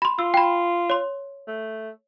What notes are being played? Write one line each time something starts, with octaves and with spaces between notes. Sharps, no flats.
B5 C6
F4 E6
G5 B5
C#5 C6
A3